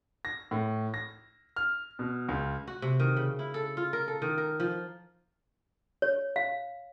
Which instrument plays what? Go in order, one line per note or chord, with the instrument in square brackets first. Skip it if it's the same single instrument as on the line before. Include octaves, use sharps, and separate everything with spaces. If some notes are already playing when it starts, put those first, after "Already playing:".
[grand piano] A#6
A2
A#6
F6
B2
C#2
[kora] F#4
C3
D#3
C#3
E4
A4
F4
A#4
A4
D#3
A#4
F3
[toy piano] C#5
F5